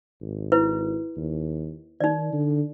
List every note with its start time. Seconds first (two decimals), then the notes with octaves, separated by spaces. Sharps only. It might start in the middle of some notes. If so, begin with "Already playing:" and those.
0.22 G#1
0.52 E4 B4
1.17 D#2
2.00 D#3 D#4 D5
2.33 D3